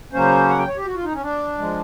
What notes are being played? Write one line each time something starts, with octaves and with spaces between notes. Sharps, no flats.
C#3 F#3 A#3 C#4 C5
F#5
G5
C#5
G4
F#4
F4
D#4
C#4
D4
F3 G#3